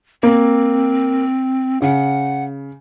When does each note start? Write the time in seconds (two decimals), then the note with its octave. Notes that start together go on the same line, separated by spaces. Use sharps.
0.23 A#3 C4
1.82 C#3 F#5